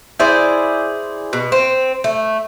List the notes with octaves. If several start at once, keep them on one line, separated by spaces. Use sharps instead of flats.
E4 G#4 C5 D5
B2
C4
A3